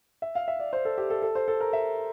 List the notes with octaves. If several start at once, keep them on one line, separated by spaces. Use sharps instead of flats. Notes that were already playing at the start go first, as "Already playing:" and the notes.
E5
F5
E5
D5
C5
A4
G4
A4
A4
C5
A4
A#4
E5